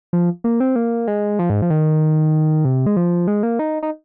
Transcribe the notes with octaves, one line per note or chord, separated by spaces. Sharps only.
F3
A#3
C4
A#3
G#3
F3
G#2
F3
D#3
C3
G#3
F3
G#3
A#3
D#4
D#4